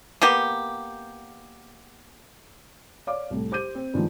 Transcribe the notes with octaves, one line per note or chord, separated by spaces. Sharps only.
A#3 B3 G4
C#5 D5 F5 D6
C2 A2
G4 C5 D6 G6 D#7
C4
G2 D#3 F3 G#3